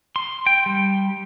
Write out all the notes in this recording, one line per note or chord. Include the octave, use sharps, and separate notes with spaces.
C6
G5
G3